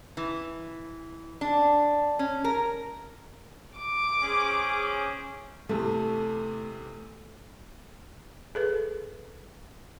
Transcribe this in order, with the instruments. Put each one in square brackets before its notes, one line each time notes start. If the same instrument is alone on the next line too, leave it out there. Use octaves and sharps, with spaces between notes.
[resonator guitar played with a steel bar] E3
D4
C#4
A#4
[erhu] D6
[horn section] C#4 G#4 C5
[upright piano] E2 C3 [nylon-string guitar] A3
[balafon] G#4 A4 B4